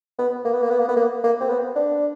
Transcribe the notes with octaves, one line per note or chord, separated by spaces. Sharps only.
B3
A#3
B3
A#3
B3
A#3
B3
A#3
A#3
C4
B3
D4